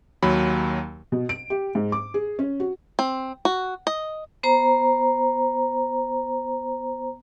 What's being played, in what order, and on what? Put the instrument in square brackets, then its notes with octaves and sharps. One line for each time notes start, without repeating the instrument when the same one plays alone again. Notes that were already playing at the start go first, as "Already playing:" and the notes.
[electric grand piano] D#2 F#3 B5
[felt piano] B2
D7
G4
G#2
D6
G#4
C#4
F#4
[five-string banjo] C4
F#4
D#5
[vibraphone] B3 C5 A#5